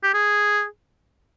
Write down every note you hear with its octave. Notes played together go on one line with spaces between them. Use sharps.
G4
G#4